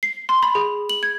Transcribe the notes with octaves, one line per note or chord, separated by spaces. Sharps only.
C7
C6
B5
G#4
F#7
G#6